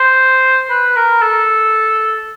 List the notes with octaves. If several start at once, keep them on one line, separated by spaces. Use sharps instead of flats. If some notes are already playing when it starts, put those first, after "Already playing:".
Already playing: C5
B4
A#4
A4